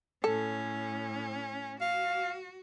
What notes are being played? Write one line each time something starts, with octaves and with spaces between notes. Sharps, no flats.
A2 C#4 A4
F#4 F5